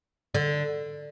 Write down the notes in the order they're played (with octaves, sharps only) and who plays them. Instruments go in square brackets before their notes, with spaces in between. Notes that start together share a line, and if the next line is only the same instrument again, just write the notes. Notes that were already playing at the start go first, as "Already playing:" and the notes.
[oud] D3